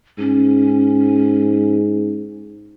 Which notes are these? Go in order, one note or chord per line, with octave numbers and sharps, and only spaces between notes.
G#2 C#4